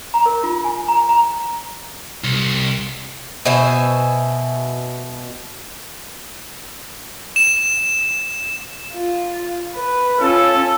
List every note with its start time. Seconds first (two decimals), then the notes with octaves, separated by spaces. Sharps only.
0.14 A#5
0.26 A#4
0.44 F4
0.64 G#5
0.88 A#5
1.09 A#5
2.24 C2
3.45 B2 C5 E5 G#5
7.36 E7
8.93 F4
9.75 B4
10.20 C#4 F4 A4